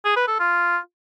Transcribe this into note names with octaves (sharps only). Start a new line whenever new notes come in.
G#4
B4
A4
F4